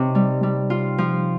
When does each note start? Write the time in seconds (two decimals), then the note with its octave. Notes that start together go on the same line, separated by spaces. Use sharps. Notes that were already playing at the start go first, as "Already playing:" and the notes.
Already playing: C3 D#4 C#5
0.15 G3
0.43 G3
0.70 F4
0.98 F3